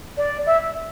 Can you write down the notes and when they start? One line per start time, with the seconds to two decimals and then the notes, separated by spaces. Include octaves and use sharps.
0.17 D5
0.46 E5